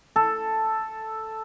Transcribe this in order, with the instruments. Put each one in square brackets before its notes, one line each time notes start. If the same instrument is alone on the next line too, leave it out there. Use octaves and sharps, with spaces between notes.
[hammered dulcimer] A4